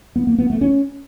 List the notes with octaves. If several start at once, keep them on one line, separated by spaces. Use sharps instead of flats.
B3
A#3
B3
A3
C#4